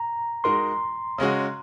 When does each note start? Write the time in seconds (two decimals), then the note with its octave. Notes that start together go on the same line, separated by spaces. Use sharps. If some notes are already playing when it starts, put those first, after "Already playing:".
Already playing: A#5
0.44 G#3 D#4 F#4 A#4 C6
1.18 C#3 G#3 C#4 F#4